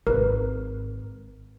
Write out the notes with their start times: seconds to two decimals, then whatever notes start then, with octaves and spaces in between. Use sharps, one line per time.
0.07 G#1 A#4 B4